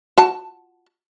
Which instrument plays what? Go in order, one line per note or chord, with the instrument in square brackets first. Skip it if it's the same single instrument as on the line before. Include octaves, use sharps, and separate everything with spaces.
[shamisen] F#4 A5